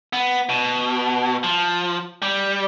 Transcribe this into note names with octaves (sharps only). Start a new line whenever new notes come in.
B3
B2
F3
G3